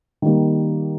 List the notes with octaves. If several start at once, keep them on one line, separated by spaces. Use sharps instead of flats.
D#3 G3 A#3